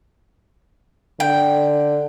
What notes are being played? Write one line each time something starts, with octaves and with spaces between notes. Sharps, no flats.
D3 G5